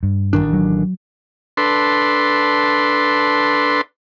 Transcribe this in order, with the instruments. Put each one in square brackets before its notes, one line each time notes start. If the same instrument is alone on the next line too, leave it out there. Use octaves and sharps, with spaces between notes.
[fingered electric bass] G2
[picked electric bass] A1 D#3 D4
[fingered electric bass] F#3
[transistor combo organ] D4 A4 B4 C6